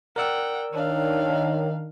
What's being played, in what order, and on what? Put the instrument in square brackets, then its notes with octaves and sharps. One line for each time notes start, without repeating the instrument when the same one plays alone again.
[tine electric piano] A#4 D5 E6 [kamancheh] F#5 G5
[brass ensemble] D#3 [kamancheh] D4 F5 [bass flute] C#5